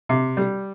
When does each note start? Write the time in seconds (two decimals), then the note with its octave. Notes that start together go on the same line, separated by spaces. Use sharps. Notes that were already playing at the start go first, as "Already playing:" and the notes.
0.09 C3
0.37 G3